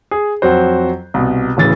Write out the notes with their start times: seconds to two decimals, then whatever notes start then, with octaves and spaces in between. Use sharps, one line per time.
0.11 G#4
0.42 F2 F#3 F#4 C5
1.14 C2 B2
1.57 D1 C#3 E3 A6